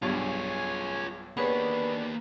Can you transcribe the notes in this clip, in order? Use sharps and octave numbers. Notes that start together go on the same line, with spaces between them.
B1 G2 F4 G#4 C#5 G#5
A#3 B3 D4 G4 G#4 B4 C#5 B5